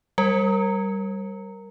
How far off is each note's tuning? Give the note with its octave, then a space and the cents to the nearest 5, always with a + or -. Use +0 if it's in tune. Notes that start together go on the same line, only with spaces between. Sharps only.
G3 -10 A#4 +0